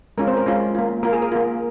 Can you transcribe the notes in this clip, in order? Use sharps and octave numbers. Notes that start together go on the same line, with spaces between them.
G#3 C#4 F4 A#4
C4 C5
A#4
G#3 C#4 F4
A#3 F4
A#3 F4 A#4
G#4
A#4
A#3 F4